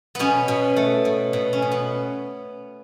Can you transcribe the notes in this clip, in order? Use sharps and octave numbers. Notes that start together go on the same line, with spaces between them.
B2 B3 C#4
B2
A3
B2
B2
C#4
B2
B3